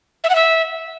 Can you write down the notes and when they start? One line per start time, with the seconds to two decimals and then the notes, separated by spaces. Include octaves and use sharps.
0.24 E5
0.30 F#5
0.35 E5